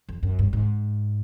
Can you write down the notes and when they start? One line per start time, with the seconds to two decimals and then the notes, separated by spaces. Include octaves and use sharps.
0.09 F2
0.23 F#2
0.39 G2
0.53 G#2